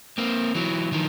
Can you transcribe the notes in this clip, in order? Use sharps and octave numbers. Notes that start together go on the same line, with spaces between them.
A#3 C4
E3 F#3
D#3 F3